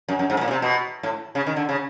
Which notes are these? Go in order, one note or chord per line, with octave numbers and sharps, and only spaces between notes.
F#2
F#2
G#2
A2
A#2
C#3
C3
B2
A2
C#3
D#3
D3
C#3